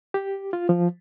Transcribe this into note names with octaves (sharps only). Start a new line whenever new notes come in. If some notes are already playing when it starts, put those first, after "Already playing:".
G4
F4
F3